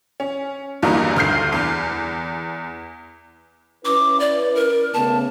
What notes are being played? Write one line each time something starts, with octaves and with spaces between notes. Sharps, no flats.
C#4
E2 G2 D#3 F#3 A#3 D#4
D2 G2 F6 G6 C7
E2
C#4 E4 B4 D6
D5
A#4
C#3 A3 B3 A5